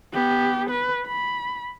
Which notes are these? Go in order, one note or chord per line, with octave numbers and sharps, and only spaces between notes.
B3 G4
B4
B5